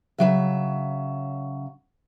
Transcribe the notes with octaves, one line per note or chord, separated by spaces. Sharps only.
C#3 E3 F#3 E5